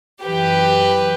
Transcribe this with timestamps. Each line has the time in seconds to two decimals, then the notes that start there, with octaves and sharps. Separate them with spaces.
0.24 F#2 E3 G4 B4